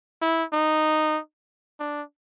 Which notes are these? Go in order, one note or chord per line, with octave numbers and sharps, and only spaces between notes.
E4
D#4
D4